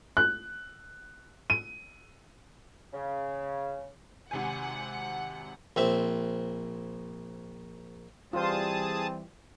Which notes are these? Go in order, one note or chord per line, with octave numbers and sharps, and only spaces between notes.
F#6
D#7
C#3
G#1 C3 F#5 G#5
A#1 C4 E5
E3 G3 C4 F4 G#4 C5 A5 D#6